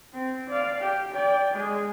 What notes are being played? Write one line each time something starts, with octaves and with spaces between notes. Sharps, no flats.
C4
D5 F5
G4
D5 G5
G#3 G#4